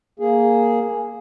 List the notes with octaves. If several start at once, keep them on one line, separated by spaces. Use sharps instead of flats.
A#3 G#4